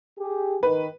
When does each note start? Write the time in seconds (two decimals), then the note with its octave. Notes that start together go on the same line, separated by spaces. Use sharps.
0.19 G4 G#4
0.63 D#3 B4